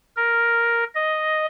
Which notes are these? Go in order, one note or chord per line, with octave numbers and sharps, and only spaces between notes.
A#4
D#5